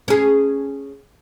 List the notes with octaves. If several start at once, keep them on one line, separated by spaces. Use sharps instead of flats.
C#4 G#4